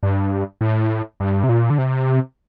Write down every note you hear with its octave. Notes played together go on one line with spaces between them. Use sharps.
G2
A2
G2
C3
A#2
D3
C3